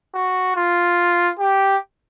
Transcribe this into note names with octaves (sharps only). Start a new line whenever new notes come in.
F#4
F4
G4